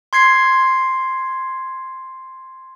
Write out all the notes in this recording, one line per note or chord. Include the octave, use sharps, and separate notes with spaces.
C6 G#6 C7